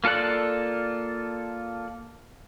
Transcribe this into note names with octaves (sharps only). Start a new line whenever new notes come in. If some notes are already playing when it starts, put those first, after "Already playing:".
A#3 F4 A4 D5 F#6